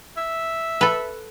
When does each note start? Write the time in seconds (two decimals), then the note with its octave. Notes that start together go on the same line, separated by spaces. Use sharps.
0.17 E5
0.81 A4 B4